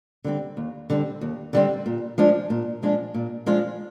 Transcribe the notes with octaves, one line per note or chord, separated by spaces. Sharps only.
D3 G3 C4
D#2
D3 G3 C4
D#2
D3 G3 C4
A#2
F3 G#3 D4 F4
A#2
F3 G#3 D4 F4
A#2
F3 G#3 D4 F4